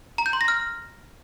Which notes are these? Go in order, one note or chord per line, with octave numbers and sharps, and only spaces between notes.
A#5
G6
C6
A#6
F6